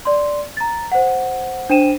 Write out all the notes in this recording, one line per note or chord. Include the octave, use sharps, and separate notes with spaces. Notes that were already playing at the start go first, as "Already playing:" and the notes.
D5 C6
A#5 A6
C5 F#5
D4 C5 G5 D#7 E7